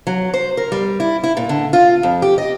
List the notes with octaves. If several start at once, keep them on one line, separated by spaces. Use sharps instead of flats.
F#3
C5
A#4
G3
E4
E4
A#2
D3
F4
F2
G4
D#5